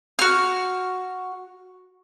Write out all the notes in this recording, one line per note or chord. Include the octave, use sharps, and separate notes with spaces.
F#4 F6